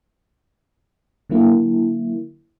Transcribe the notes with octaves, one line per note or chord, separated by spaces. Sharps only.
D3 F#3 A#3 E4